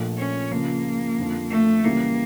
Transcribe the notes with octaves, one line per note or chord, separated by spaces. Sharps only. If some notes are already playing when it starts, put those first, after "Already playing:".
Already playing: A#1 A#2 F3 A3
C#4
C#2 C#3 F3 A#3
F2 D3 F3
A3
C#2 C#3 E3 G3 A#3